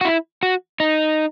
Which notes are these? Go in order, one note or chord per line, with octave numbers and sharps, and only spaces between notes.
F#4
E4
F#4
D#4